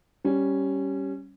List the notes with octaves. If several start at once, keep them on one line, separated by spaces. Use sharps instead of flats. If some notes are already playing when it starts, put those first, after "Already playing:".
G3 C#4